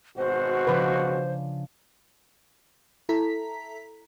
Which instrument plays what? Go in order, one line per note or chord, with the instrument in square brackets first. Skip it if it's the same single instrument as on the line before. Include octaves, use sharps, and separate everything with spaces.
[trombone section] G#1 B2 F#4 [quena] C5
[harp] C#3 F3 D4 [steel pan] B4
[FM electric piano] E4 A4 A#5 B6